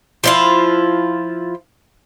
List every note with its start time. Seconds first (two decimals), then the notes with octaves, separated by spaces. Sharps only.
0.24 F3 E4 F4